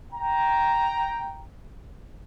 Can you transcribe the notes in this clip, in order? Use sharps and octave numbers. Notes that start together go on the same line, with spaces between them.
G5 A#5